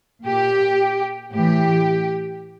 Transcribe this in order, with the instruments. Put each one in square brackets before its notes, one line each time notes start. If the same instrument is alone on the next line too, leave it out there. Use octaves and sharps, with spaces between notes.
[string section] A#2 G4
A2 E3 G4